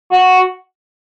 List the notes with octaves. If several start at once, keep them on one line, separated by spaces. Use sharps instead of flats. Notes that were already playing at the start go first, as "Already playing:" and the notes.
F#4